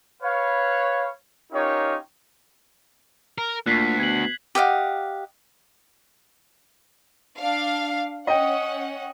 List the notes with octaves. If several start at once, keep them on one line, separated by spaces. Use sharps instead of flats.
B4 C#5 F5
C#4 D#4 F4 G4 A#4 C#5
A#4
D2 A#2 F#6 B6 C7
B2 G#6 F#7
G4 D#5 F5 F#5
D4 F5
C#4 D#5 F#5 G5